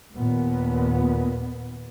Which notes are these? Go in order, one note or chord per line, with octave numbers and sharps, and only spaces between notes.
D#2 A#2 B3